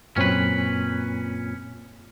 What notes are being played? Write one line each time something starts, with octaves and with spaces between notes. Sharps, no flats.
F#2 A#2 C4 C#4 B4 C#5